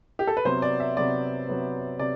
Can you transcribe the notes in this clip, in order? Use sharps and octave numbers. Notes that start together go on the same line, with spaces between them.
G4
A4
B4
C3 F#3 B3 C5
D5
E5
C3 F#3 B3 D5
C3 F#3 B3
C3 D5